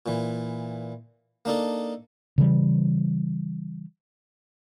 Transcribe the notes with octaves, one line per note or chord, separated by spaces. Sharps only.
A#2 E3
A#3 D4 D#4 A4
C#3 E3 G3